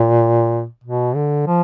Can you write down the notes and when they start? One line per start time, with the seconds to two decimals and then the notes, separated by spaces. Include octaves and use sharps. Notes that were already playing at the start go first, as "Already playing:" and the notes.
Already playing: A#2
0.84 B2
1.15 D3
1.47 F3